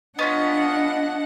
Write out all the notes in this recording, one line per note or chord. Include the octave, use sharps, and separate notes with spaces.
B3 C#4 D4 F4 D#5 F#5